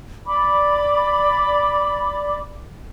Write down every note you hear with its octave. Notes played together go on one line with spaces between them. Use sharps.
D5 B5 D6